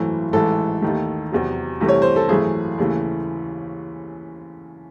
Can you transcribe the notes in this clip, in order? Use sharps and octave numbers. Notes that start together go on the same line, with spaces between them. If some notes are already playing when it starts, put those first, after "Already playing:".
Already playing: G#1 F#2 E3 A3
A1 G#2 E3 A4
D#2 D#3 A3
E2 C3 F#3
C2 C3 E3 A3
C#5
C5
A4
G#1 F#2 E3 A3 G#4
D#2 C#3 E3 A3